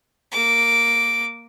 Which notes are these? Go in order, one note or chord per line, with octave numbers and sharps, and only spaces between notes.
A#3 D6